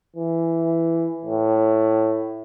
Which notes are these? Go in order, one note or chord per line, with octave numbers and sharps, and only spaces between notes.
E3
A2